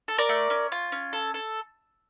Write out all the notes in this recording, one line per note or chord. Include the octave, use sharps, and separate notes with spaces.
A4
A#4 D5
A3
C#4
F4
C#4
A4
A4